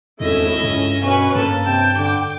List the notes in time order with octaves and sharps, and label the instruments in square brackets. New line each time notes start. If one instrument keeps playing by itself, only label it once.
[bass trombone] G#1 [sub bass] E2 [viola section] A3 C#4 E4 [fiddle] D#5 E5
[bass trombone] C#2 [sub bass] G2 [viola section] C#4
[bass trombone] B2 [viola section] C#4 B4 [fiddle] G#5 C#6
[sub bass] G2 [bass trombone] A#3 [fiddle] A4
[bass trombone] C3 [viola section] G5 [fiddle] A5
[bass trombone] D3 [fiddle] D6